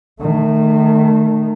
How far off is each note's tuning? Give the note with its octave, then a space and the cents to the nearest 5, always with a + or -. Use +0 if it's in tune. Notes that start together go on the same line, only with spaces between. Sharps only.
D#3 -30 A3 -5